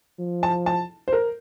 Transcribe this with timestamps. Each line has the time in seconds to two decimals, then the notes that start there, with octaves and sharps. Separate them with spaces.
0.19 F3
0.43 A5
0.66 A5
1.08 C5
1.13 A#4